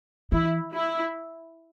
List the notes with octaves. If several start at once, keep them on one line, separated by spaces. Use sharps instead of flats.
E3 E4
E4